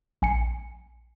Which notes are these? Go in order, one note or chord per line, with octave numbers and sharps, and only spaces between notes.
A#1 G#5 C7 C#7